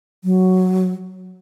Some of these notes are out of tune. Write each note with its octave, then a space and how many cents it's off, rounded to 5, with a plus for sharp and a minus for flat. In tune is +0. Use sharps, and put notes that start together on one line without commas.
F#3 +5